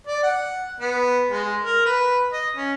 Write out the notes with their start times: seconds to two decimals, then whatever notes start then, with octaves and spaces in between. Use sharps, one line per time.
0.07 D5
0.23 F#5
0.80 B3
1.30 G#3
1.62 A#4
1.85 B4
2.32 D#5
2.56 C#4